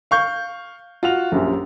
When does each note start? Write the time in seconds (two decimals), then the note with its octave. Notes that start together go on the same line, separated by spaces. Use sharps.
0.11 F5 C#6 G6
1.03 F4 F#4 F7
1.32 A#1 F#2 G4